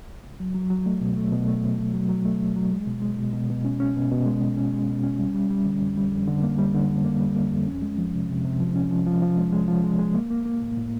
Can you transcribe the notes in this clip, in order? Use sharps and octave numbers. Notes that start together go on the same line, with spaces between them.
C#2
F#3
F#3
F#3
A3
B2
A3
B2
A3
B2
B2
F#3
F#3
A3
C#2
F#3
G#3
B2
G#3
B2
B2
B2
C#4
C#4
B2
B2
G#3
B2
C#4
G#3
B2
C#4
G3
G3
G3
D3
F2
G3
F2
D3
A#3
G3
D3
F2
A#3
G3
A#3
F2
C#4
G#3
F3
C3
C3
C3
F3
C#4
F3
F3
F3
G#3
G#3
F3
G#3
G#3
A#3
A#3
A#3
A2
A2